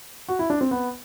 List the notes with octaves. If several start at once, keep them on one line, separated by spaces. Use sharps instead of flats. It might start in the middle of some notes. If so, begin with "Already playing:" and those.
F#4
E4
D4
C4
B3